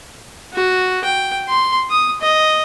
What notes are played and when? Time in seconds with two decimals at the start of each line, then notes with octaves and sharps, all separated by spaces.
0.53 F#4
1.04 G5
1.48 C6
1.90 D#6
2.21 D#5